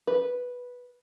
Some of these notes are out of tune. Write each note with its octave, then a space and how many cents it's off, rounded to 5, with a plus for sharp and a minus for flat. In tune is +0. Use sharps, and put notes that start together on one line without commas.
B4 -5